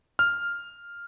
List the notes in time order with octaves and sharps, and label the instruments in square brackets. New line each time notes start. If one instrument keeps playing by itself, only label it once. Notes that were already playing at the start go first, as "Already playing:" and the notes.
[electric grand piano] F6